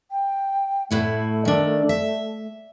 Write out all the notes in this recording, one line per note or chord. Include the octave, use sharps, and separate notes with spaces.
G5
A2 A3 E4 F#5
D#3 D4
E5